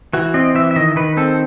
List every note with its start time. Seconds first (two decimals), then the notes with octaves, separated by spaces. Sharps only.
0.13 E3 F#4
0.34 C4 D#5
0.55 E3 E5
0.71 E5
0.76 D#3 D#5
0.96 D#3 B4
1.17 C4 A4